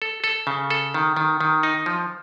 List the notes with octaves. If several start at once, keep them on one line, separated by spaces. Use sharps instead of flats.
A4
A4
C#3
A4
D#3
D#3
D#3
D#4
F3